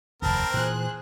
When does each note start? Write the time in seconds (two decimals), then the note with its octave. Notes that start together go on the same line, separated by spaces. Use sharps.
0.22 F1 D#2 C4 A#4 A5 B5
0.54 A#2 E3 G#4 C5 F#6